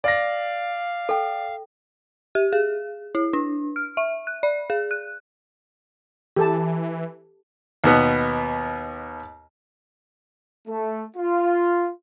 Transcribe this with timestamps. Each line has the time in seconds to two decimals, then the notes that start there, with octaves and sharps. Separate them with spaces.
0.04 D5 F5 A#6
1.09 A4 G5
2.35 G4
2.53 G#4
3.15 E4
3.33 D4
3.76 F6
3.97 E5
4.27 F#6
4.43 D5
4.70 G#4
4.91 F#6
6.36 E3 G4 A4 A5
7.84 D#2 B2 B3
10.68 A3
11.17 F4